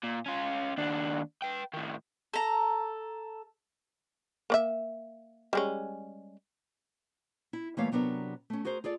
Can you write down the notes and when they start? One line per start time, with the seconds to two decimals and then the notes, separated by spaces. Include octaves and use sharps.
0.03 A#2
0.26 C#4 F4
0.78 D#2 D4
1.42 B4 G5
1.74 A2 D#3
2.34 A4 A#5
4.50 A#3 D5 E5
5.53 G3 G#3 C#4
7.53 E4
7.77 E3 G3 A3 A#3 C#5 F5
7.92 C3 F#3 B3 D4 A#4
8.50 A3 C#4
8.65 F#4 G#4 A#4 C5
8.84 F4 G#4 A4 D5